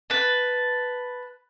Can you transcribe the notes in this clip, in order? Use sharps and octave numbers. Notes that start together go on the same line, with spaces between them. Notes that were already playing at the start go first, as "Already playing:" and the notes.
B4 A5